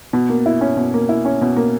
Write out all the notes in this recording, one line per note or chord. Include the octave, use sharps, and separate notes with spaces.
B2
A#3
E4
C#4
B2
A#3
E4
C#4
B2
A#3